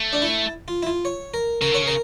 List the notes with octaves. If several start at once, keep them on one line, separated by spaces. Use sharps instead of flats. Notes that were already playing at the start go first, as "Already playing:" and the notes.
Already playing: A3
D4
E4
F4
E4
F4
C#5
A#4
C#3 A#4
D3 C#5
C#3
A#4